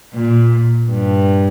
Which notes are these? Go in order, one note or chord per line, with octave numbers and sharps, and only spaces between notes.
A#2
G2